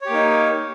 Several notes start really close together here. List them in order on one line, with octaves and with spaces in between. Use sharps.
C#5 G4 A#3 D#4